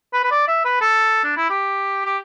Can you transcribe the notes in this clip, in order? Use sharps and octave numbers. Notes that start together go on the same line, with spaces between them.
B4
B4
D5
E5
B4
A4
D4
E4
G4
G4